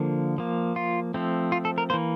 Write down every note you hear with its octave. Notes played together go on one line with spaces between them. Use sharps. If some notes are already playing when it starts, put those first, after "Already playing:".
Already playing: D3 F3 A#3
F3 A#3
F4
F3 A3 C4
F4
A4
A#4
E3 A#3 C5